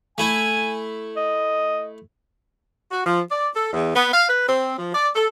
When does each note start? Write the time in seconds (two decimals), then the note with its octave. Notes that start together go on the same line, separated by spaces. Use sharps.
0.18 A3 E4 G#5
1.17 D#5
2.91 F#4
3.06 F3
3.31 D5
3.55 A4
3.73 E2
3.95 B3
4.13 F5
4.29 B4
4.48 C4
4.78 F3
4.95 D5
5.15 A4